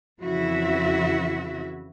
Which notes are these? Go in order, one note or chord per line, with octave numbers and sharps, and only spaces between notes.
F2 C#3 E3 E4 F#4 E5